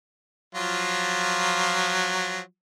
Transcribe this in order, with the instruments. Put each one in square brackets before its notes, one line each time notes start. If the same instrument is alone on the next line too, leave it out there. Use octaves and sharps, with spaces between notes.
[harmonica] F3 F#3 F4